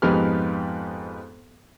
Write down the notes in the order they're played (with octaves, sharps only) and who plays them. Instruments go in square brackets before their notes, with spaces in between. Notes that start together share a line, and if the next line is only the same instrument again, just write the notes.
[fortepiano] F2 G#2 B3 D#4 G4 F6